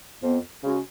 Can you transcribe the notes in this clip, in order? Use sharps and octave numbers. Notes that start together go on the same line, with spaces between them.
F2 F3 B3
C#3 G#3 C#4 F#4